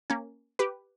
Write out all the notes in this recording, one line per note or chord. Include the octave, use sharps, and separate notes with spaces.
A#3 C#4
G4 B4